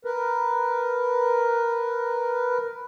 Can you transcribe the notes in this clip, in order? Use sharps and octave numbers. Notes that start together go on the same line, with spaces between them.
A#4 B4